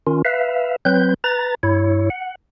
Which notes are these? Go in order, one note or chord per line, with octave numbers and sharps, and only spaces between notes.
D#3 C#4 F4
B4 E5 F5
F#3 C4 B4 G6
B4 A#5 A6
G2 E4 C#5
F#5